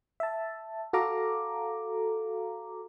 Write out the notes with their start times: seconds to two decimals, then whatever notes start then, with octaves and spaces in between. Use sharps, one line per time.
0.20 E5 A5
0.93 F#4 A4 F5 A#5 D6